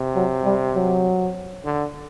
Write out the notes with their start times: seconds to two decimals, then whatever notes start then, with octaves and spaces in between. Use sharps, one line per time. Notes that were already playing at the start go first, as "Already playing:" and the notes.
Already playing: C3
0.16 F#3
0.44 G3
0.75 F#3
1.65 D3